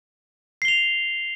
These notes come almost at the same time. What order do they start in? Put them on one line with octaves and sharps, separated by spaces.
C7 G7 F7